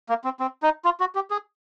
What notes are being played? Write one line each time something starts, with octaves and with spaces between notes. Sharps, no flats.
A#3
C4
C4
D#4
F4
F#4
G4
G#4